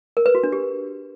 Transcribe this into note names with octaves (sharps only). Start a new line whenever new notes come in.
A#4
B4
F#4
D4
G4